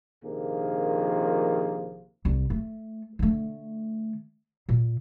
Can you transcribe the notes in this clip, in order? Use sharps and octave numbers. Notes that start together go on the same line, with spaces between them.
A#1 C3 D#3 F3 A#3 G#4
C2
A3
D3 A3
A#2